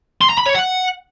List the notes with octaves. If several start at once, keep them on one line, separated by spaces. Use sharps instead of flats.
C6
A#5
B5
C#5
F#5